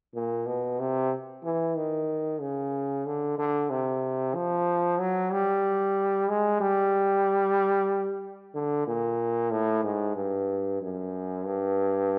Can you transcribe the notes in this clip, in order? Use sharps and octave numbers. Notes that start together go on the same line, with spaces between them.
A#2
B2
C3
E3
D#3
C#3
D3
D3
C3
F3
F#3
G3
G#3
G3
D3
A#2
A2
G#2
G2
F#2
G2